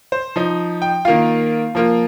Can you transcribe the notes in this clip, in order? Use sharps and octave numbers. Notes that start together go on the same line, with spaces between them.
C5
F3 D#4
G5
D#3 A#3 F4 F5
F3 A#3 F4